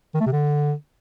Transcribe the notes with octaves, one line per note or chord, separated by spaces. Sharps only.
D#3
A3
C3
D3